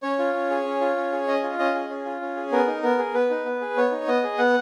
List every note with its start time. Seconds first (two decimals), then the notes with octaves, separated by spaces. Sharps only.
0.03 C#4 C#5
0.19 F4
0.34 C#4
0.50 G#4
0.65 C#4
0.81 F4
0.96 C#4
1.12 G#4
1.27 C#4 D#5
1.43 F4
1.59 C#4 D#5
1.74 G#4
1.90 C#4
2.05 F4
2.21 C#4
2.36 G#4
2.52 B3 A#4
2.67 D#4
2.83 B3 A#4
2.99 G#4
3.14 B3 B4
3.30 D#4
3.45 B3
3.61 G#4
3.77 B3 C#5
3.92 D#4
4.07 B3 D#5
4.24 G#4
4.38 B3 F#5